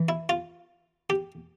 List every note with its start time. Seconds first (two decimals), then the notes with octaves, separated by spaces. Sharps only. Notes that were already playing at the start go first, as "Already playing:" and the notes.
Already playing: E3
0.09 E4
0.29 F4
1.10 G4